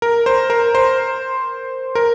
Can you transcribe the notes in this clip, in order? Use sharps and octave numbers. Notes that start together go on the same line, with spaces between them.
A#4
C5
A#4
C5
A#4